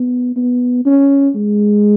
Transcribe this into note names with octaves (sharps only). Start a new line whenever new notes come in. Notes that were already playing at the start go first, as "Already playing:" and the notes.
Already playing: B3
B3
C#4
G#3